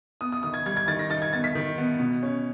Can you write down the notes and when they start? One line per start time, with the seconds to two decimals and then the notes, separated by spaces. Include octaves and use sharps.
0.21 B3 D#6
0.32 D#6
0.43 D#3 D#6
0.54 G#6
0.66 G3 G#6
0.77 G#6
0.88 D#3 A6
0.99 A#6
1.10 D#4 A6
1.22 G#6
1.33 B3 A6
1.44 B6
1.55 D#3
1.78 B3
2.00 B2
2.23 C#4